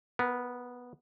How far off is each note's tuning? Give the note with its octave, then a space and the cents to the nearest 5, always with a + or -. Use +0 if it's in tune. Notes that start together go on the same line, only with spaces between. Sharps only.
B3 -5 A#4 +25